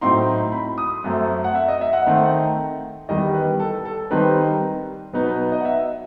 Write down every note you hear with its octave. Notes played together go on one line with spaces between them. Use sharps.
A2 F#3 C4 D#4 C6
B5
D#6
F#2 F#3 A3 C4
F#5
E5
D#5
E5
F#5
D#3 A3 C4 D#4
E2 D#3 G3 D#5
B4
A4
A4
D#3 G3 C4 D#4 B4
B2 F#3 B3 D#4 B4
B4
D#5
F#5
E5